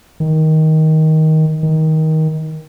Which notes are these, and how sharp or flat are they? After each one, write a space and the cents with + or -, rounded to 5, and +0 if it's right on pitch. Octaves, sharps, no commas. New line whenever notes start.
D#3 +15
D#3 +20